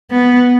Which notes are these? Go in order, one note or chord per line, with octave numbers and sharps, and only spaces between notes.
B3